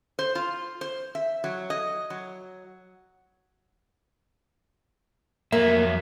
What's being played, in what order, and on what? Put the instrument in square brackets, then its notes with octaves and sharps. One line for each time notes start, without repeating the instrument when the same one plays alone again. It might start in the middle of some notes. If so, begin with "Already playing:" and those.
[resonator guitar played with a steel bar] C5
F4
C5
E5
F#3
D#5
F#3
[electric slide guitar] F2 F#3 E5 [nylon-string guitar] A#3